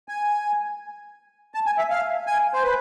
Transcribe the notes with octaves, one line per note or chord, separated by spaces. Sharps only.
G#5
A5
G#5
E5
F5
G#5
C5
B4